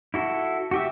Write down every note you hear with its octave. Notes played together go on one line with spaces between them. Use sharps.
E4 F#4 A4
F#4 G4 E5